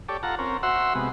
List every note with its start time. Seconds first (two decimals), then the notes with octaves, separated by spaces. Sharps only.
0.09 G4 A4 C#5 D5
0.23 F4 A4 F#5 A#5
0.39 C4 C#4 A#4
0.63 F#4 C5 E5 F#5 C6 E6
0.95 C3 G#3 B3